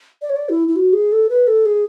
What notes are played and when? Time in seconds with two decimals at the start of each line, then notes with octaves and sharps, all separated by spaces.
0.22 D5
0.30 C#5
0.36 D5
0.49 E4
0.68 E4
0.76 F#4
0.93 G#4
1.12 A4
1.29 B4
1.47 A4
1.66 G#4